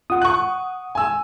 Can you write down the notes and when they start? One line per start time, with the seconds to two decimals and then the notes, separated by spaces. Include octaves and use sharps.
0.10 F4 F#5 D#6
0.22 C#6 F#6
0.95 G#5 E6